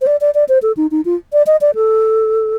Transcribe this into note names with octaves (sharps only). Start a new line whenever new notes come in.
C5
D5
D5
D5
C5
A4
D#4
D#4
F4
D5
D#5
D5
A4